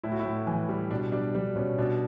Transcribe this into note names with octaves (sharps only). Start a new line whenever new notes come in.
A2 E4
F#4
E4
A2
E3
G3
B2 D4
G3 D4
G3 D4
B2 C#4
B2 D4